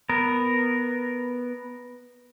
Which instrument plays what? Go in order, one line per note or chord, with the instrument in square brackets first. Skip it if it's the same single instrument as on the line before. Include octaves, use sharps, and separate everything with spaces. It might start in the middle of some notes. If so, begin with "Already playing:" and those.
[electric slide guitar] B3 A#4